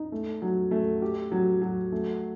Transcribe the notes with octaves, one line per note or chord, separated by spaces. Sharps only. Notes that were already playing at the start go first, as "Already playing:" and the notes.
Already playing: D#4
A3
F#3
A3
G4
F#3
F#3
A3